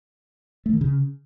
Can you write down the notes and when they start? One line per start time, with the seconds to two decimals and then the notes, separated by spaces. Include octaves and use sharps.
0.66 A3
0.73 D#3
0.81 C#3